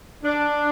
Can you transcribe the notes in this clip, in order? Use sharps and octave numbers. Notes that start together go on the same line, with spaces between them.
D4